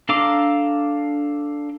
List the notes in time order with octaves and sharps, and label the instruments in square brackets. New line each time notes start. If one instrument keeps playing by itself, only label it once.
[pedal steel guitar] D4 A4 F5 A#5 D6